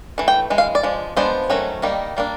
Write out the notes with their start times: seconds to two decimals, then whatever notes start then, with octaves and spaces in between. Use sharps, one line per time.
0.18 E3 A3
0.28 G5
0.50 E3 G#3
0.58 F5
0.75 D5
0.83 F3 G#3
1.16 F3 G#3 B3 D4 C5
1.50 D#3 F#3 A3 C#4
1.82 D#3 G3 A#3 D#4
2.17 G3 A#3 D4